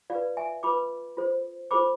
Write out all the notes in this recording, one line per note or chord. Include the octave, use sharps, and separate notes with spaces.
F4 B4 D5 F5
E5 G#5
F4 B4 B5 D6
F4 A4 C5
F4 A4 C5 B5 D6